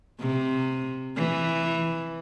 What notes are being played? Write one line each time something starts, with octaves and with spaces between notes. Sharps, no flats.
C3
E3